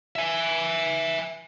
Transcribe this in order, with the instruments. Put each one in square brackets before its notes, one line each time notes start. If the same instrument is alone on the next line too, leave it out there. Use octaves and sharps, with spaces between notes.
[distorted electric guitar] E5 G#5